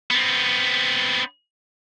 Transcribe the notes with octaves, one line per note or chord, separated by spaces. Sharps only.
B3 C4